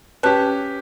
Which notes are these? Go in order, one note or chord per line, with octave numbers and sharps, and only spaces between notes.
C#4 G4 B4 A5 F#6